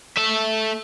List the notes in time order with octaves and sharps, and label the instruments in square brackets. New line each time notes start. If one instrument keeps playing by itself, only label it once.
[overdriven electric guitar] A3 E5